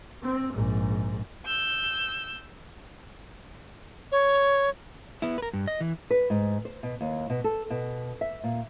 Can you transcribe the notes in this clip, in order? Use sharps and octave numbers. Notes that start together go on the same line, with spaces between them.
C4
A#1 G#2
E6 G6
C#5
B3 E4
A#4 B4
G2
D#5
E3
B4
G#2
C5
B2
D#2
B2
A4
B2
E5
A#2